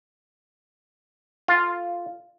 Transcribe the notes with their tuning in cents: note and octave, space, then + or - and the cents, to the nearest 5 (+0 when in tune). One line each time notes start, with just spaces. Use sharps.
F4 +0 A4 +0